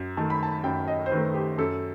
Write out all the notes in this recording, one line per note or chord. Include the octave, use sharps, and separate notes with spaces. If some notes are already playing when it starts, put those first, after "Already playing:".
Already playing: F#2
D#3 A3 A5
B5
A5
F#2 G5
D#5
C5
D#3 A3 B4
G4
F#2 A4